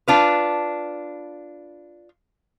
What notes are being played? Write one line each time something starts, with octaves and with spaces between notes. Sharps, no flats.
D4 F4 B4